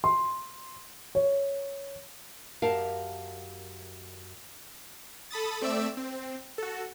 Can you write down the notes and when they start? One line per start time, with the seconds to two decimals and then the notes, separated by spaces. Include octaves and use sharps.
0.04 C6
1.15 C#5
2.62 F#2 G4 A#4 F5 A5
5.31 A4 B5 D#6 A6
5.61 A3 C4 D5 E5 E6 D7
5.97 C4
6.58 F#4 A4